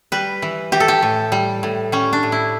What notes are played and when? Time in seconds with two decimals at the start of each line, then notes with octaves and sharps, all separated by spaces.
0.12 G3 B4
0.42 E3
0.72 E3 G4
0.80 A4
0.88 G4
1.03 A2
1.32 G3
1.63 A2
1.92 G3 C#4
2.13 D4
2.23 A2
2.32 E4